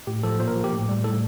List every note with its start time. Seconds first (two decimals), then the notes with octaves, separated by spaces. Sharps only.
0.07 A2 G4
0.23 F3 A4
0.39 A#2 C5
0.48 A#4
0.56 F3
0.64 G4
0.72 A2
0.89 G3
1.04 A2 A4